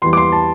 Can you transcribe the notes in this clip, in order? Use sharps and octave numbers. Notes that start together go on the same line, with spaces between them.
E2 E3 G3 C6
D6
C6
A5